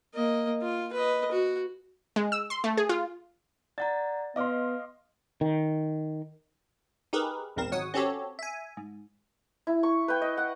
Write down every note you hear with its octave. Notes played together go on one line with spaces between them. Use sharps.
A#3 D#5
F4
B4 D#5
F#4
G#3
E6
C6
A3
G#4
F4
D5 F#5 A#5 A6
B3 D#5 F5 C6 D6 F6
D#3
D#4 G4 G#4 A#4 B4
A#1 E2 G#2 C4 A#4 E7
G#1 F#3 C#5 F#5 D#6
C4 C#4 F#4 G4 A4 C#5
E5 G#5
G#2
E4
C#6
B4 G5
D#5
F#5